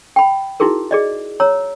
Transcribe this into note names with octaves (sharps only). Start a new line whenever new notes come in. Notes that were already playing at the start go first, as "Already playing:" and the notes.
G5 B5
D#4 E4 F#4 G#4 A#4
G#4 D5 D#5
C#5 A#5 E6